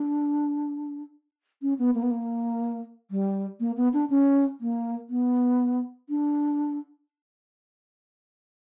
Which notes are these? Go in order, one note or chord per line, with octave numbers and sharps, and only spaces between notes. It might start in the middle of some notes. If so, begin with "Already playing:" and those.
Already playing: D4
C#4
B3
A#3
B3
A#3
G3
A#3
B3
D4
C#4
A#3
B3
D4